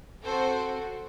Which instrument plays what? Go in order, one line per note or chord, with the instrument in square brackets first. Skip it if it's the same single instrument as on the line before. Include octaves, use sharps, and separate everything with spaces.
[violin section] C4 F#4 A4 C5